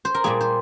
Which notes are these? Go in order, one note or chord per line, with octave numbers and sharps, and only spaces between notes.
C5
A#4
A#2 G3 A#3 G#4
C5